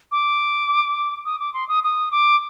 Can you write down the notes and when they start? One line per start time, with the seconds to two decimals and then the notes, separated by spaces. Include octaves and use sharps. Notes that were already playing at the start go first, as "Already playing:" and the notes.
0.12 D6
1.26 D#6
1.40 D6
1.54 C6
1.69 D#6
1.84 D#6
2.12 D6